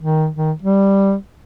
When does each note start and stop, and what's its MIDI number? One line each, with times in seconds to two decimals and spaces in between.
0.02 0.29 51
0.36 0.52 51
0.62 1.14 55